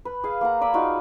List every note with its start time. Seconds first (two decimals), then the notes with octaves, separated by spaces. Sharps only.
0.05 B4
0.24 G#4 F5
0.41 A#3 F#5 A#5
0.61 D5 G#5 B5 E6
0.74 D#4 F4 F#4 D5